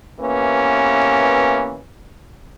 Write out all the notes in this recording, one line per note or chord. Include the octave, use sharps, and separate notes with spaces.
C3 E3 A#3 B3 C#4